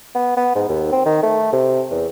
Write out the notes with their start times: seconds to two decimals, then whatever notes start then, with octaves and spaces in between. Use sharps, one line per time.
0.15 B3
0.37 B3
0.55 G#2
0.69 D#2
0.92 C4
1.06 D#3
1.23 A3
1.53 C3
1.91 E2